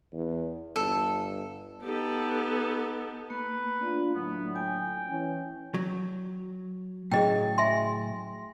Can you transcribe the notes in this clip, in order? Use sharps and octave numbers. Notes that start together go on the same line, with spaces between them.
E2
G1 A4
B3 D#4 G4 A4
A#3 B4
D4 F4
A2 D3 F#3 B3
G5 G#5
E3 C#4
F#3
A2 C#3 F#3 G#4 D#5 G5
E5 G#5 C6